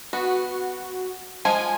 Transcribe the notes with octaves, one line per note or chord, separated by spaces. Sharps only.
B3 F#4
F3 G#3 F4 G#5